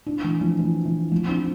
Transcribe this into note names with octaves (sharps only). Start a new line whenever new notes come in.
D4
E3
F3
E3
E3
F3
C4
D4